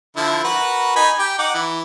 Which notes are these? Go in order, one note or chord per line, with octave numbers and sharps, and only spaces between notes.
D3 F3 E4
F#4 A#4 B4
D#4 G#5 B5
G4
D#4 F#5 D6
E3